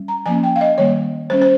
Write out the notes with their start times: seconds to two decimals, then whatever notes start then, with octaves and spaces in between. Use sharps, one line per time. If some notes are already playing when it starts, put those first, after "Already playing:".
Already playing: G3 C#4
0.08 A#5
0.26 F3 A#3 C#4 G#5
0.43 G5
0.56 F5
0.61 D#5
0.78 D#3 G3 A#3 C#5
1.30 G3 C#4 C5
1.42 C5